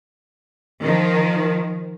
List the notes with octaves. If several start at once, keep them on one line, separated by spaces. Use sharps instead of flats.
D#3 F3